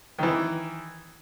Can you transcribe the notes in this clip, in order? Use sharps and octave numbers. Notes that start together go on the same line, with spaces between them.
D#3 E3